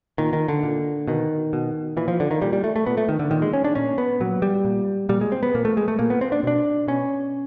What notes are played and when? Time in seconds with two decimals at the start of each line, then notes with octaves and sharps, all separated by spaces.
0.18 A#2 D#3
0.33 D#3
0.48 D3
0.63 A#2
1.08 B2 D#3
1.53 B2
1.97 A#2 E3
2.08 F3
2.20 D3
2.31 D#3
2.42 A#2 G3
2.53 G3
2.64 A3
2.76 A3
2.86 A#2 B3
2.97 A3
3.09 D#3
3.19 D3
3.31 A#2 D#3
3.42 G#3
3.53 C#4
3.64 D4
3.75 A#2 C#4
3.98 B3
4.20 A#2 F#3
4.42 G3
4.65 A#2
5.09 A#2 G3
5.21 G#3
5.32 C4
5.43 B3
5.55 A#2 A#3
5.65 A3
5.77 G#3
5.88 A3
5.99 A#2 A#3
6.10 B3
6.21 C4
6.32 D4
6.43 B2 D4
6.88 B2 C#4